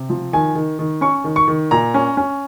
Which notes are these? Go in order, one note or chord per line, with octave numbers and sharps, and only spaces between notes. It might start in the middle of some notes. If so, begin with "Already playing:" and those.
Already playing: C3
F3
D#3 G#5
D#3
D#3
C#4 C#6
D#3
C#6
D#3
A#2 A#5
C#4
C#4